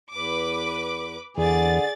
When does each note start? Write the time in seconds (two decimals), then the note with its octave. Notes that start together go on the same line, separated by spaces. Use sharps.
0.12 E2 B4 D6
1.37 E2 D3 G#4 D5 A6